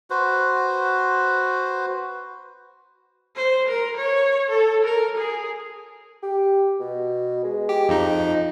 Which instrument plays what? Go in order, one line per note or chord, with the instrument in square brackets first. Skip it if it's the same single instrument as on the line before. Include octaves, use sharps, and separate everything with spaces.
[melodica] F#4 B4 C5
[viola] C5
A#4
C#5
A4
A#4
G#4
[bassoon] G4
B2
G#3
[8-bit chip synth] G4
[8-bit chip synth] F2 D#4 [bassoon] F4